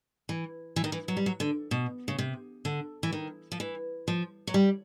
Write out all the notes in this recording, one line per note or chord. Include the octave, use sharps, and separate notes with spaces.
E3
E3
D#3
E3
F#3
G3
F#3
D3
B2
C#3
C3
D3
E3
D#3
F3
E3
F3
F#3
G3